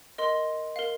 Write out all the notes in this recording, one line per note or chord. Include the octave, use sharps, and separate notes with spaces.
A#4 D#5 C6
A#4 F5